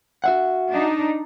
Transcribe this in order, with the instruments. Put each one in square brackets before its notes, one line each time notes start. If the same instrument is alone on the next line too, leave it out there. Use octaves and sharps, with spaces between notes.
[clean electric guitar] F#4 E5 F#5
[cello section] D4 D#4